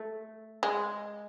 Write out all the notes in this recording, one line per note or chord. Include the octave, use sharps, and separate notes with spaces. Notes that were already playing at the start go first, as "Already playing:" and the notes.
Already playing: A3
G#3